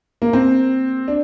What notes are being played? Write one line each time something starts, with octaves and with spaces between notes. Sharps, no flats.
A#3
C4
D4